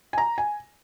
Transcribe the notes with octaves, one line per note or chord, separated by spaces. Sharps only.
G#5
A#5
G#5